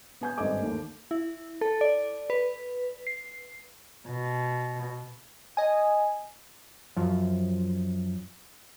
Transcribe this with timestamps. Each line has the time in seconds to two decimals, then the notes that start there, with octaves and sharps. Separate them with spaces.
0.21 B3 G#5 G6
0.38 G#1 G2 A4 D#5 G#5 D6
0.60 D#2 A3 A#3
1.11 E4
1.61 A4
1.81 D5
2.30 B4
3.07 C7
4.07 B2
5.57 D#5 G#5
6.97 F#2 F3